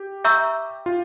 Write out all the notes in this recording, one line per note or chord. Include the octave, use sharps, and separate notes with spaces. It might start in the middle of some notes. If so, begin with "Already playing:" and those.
Already playing: G4
E5 A#5 C#6 E6 G6
F4